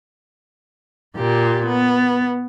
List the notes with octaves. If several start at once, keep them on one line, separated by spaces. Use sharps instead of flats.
A#2 G4
B3